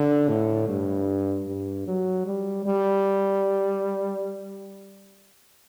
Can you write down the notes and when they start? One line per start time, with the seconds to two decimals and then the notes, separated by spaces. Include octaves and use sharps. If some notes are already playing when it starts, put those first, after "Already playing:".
Already playing: D3
0.28 A2
0.68 G2
1.48 G2
1.87 F#3
2.26 G3
2.66 G3